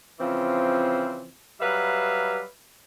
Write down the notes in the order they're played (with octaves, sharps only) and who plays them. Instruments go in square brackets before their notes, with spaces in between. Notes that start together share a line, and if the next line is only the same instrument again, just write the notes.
[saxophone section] C#3 E3 F3 C4
F#3 G3 B4 E5 F5